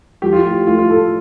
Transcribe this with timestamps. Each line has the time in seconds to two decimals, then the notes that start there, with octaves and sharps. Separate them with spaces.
0.22 F3 G4
0.33 F4
0.43 G4
0.45 A2
0.67 A3 F4
0.79 F4
0.89 A2 A4